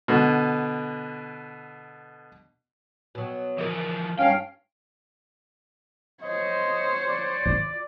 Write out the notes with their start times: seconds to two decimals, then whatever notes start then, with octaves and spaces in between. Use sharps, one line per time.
0.08 B2 D3
3.15 B2 F#3
3.58 E3 F3 A#4 D#5
4.19 G2 C#4 F5 G5
6.22 C5 C#5 D#5
7.09 D5
7.46 F4